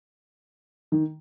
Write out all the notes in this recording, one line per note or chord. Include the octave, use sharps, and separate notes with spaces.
D#3